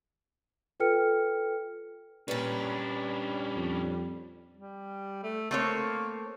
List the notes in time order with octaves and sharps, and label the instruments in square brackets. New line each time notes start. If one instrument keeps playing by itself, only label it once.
[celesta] F4 A4 B4 G5 F6 C#7
[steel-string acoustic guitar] A#2 B4 [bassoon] G3 [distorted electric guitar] C#4 D4
[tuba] F2
[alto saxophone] G3
A3
[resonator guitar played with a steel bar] A3 C4 C#5 [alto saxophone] A#3